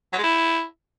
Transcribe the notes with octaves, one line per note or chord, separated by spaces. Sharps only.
F#3
G#3
E4